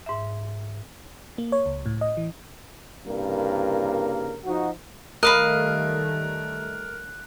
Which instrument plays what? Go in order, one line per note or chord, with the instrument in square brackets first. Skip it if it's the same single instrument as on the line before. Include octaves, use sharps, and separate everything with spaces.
[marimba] G#2 E5
[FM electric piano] A#3
C#5
C#2
A2
D#5
E3
[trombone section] C2 G2 C#3 G3 A#3 A#4
F3 D#4 F#4
[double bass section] D#3 G3 A3 [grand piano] A#4 [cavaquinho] D#5 F5 B5 [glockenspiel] F#6